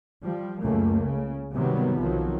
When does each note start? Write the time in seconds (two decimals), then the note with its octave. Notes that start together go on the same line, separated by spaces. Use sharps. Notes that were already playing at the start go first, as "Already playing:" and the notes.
0.23 F3 G3
0.63 C#2 F#2 A3 A#3
1.00 C#3
1.53 G#2 C3 D#3 F#3 G3 B3
1.99 B1 D#3 F3 F#3